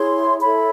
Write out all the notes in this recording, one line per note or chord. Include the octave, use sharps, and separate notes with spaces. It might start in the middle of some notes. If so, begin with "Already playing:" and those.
Already playing: E4 G#4 C#5 C6
E4 A4 C#5 B5